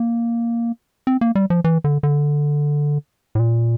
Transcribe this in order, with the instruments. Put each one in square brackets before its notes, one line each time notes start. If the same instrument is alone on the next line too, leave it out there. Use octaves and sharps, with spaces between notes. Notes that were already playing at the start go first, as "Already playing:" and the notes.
Already playing: [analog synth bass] A#3
C4
A#3
G3
F3
E3
D3
D3
A2
A#2